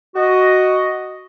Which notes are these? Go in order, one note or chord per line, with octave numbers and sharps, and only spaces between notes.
F#4 D#5